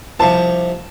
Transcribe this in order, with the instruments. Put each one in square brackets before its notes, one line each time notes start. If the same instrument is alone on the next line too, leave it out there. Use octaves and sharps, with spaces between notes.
[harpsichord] C2 C3 F3 [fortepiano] A5